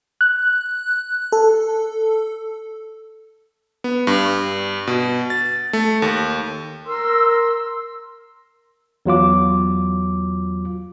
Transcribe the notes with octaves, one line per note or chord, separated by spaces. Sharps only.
F#6
A4
B3
G2
B2
A6
A3
D#2
A#4 C6 E6
E2 F#3 F4 D6